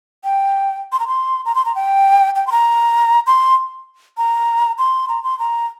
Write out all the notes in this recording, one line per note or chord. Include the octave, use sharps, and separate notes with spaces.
G5
C6
A#5
C6
A#5
C6
A#5
G5
G5
C6
A#5
C6
A#5
C6
A#5
C6
A#5